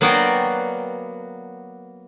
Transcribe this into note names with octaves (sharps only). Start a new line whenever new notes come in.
F#3 A#3 B3 F#4 D5 G5